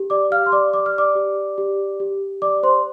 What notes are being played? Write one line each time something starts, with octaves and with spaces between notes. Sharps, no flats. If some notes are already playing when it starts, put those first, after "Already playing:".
Already playing: G4
D5 D6
G4 F5 F6
C6
D5 D6
D5 D6
F6
D5 D6
G4
G4
G4
D5 D6
C5 C6